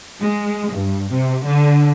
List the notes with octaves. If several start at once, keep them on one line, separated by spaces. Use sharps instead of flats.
G#3
G2
C3
D3